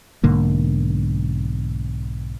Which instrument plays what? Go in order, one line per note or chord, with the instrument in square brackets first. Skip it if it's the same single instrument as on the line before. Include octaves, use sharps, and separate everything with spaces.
[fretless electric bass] B1 G#2 D3 A#3